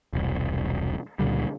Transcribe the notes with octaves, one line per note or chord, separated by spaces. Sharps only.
E1 C2
C#2 A#2 D3 G3